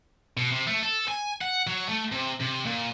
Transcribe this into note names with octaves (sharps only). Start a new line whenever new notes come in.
B2
C3
A3
A4
G#5
F#5
F#3
A3
C3
C3
A#2